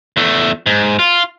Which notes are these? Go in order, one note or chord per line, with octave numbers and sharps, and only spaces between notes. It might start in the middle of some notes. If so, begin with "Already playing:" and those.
E2 A3
G#2
F4